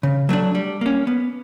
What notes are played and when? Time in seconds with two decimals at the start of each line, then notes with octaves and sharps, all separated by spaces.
0.03 C#3
0.29 F#3 A3 D4
0.55 G3
0.81 A#3 C#4
1.07 B3